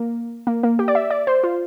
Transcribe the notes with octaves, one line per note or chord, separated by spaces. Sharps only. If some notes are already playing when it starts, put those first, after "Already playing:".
Already playing: A#3
A#3
A#3
G4
D5
E5
D5
C5
F4